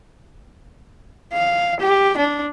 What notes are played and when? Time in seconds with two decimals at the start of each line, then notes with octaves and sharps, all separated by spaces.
1.33 F5
1.80 G4
2.17 D4